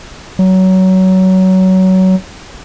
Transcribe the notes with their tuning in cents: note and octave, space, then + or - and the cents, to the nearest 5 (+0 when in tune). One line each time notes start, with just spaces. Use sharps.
F#3 +20